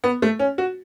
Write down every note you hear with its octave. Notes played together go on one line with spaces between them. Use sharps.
B3
A3
C#4
F#4